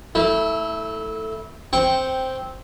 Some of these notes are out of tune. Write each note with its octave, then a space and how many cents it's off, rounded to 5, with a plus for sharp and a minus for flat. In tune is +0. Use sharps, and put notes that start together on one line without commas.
A3 +5 E4 -25
C4 +0 G5 -5 C#6 +0